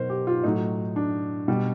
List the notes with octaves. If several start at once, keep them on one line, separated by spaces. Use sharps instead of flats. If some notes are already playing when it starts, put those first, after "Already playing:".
Already playing: B2 F#3 A#4 C5
G4
F4
A2 F#3 D#4
D4
B2 G3